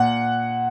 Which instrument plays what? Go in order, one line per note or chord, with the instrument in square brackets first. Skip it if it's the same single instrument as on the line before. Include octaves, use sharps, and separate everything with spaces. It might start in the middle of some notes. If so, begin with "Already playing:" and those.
Already playing: [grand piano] A#2 F#5